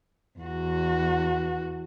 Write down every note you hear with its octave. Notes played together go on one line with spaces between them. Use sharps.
E2 F#4